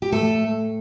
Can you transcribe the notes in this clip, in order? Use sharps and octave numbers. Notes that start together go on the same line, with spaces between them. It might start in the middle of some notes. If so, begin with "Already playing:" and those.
G4
A2 A3 A4